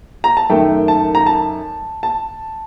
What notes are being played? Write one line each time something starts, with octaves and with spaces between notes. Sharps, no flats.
A#5
A5
F#2 D#3 A3 G5
A5
A#5
A5
A5